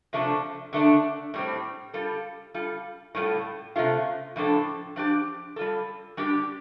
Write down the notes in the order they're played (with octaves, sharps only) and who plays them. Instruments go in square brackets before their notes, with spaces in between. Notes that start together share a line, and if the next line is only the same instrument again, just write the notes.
[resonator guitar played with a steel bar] C3 F3 A3 D4 A4
D3 A3 D4
A2 G3 C4
G3 F4 A4
G3 F4 A4
A2 G3 F4 A4
C3 A3 F4
A2 F3 D4 A4
F3 D4 G4
G3 F4 A4
G3 D4 G4